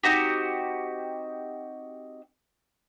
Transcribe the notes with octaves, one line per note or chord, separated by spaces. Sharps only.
C4 D#4 F#4 G4